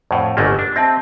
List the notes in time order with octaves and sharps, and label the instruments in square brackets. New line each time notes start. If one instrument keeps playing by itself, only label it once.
[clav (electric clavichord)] F2 A2 [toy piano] D5 F#5
[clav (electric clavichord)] G1 A3 A#3 [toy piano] G4 D#5 G#5
[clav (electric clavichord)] D4
[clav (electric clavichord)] C4 [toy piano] D#5 E5 A5